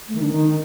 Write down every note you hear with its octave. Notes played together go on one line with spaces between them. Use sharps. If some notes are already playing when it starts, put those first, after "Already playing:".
A3
D#3
D4
D#3